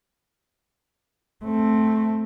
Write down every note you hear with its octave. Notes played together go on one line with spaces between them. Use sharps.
A3 C4